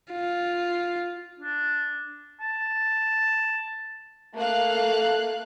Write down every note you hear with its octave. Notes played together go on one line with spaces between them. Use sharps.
F4
D4
A5
A3 A#3 A4 F5 F#6